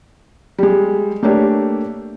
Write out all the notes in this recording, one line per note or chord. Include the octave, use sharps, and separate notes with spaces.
G3 G#3
A3 A#3 D4 G4 C#5